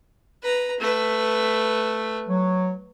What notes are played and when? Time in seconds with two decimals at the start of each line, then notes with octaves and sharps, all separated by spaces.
0.42 B4 A#5
0.79 A3 B4
2.28 F#3